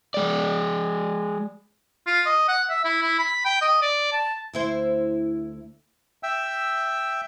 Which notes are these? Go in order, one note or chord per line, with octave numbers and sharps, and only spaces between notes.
G#3 D5
F4
D#5
F#5
E5
E4
E4
B5
G5
D#5
D5
A5
D2 E4 C5
E5 G5 E6